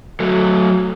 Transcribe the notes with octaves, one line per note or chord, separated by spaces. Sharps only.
F#3 A3